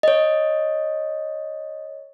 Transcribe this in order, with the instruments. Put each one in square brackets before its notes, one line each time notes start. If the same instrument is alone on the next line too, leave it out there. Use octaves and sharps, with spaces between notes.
[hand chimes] C#5 D#5